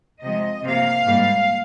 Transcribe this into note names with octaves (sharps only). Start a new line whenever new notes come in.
C3 F3 G#3 D#5
C3 F3 A#3 F5
G#2 G3 A#3